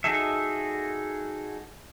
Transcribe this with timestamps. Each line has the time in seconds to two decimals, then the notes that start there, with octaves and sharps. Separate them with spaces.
0.04 D#4 F#4 G#4 A4 E5